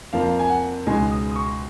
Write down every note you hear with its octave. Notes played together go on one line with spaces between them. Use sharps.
F2 F3 A#3 F5
G#5
F#5
C#2 B2 G#3 D#4 G#5
D#6
D#6
C#6